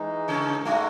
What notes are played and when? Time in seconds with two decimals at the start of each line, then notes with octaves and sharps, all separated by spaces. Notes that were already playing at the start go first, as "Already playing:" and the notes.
Already playing: E3 G#3 D#4
0.28 C#3 C#4
0.65 A2 G#3 A3 D#4 F#4